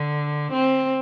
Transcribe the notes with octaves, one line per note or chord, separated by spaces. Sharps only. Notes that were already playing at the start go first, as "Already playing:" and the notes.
Already playing: D3
C4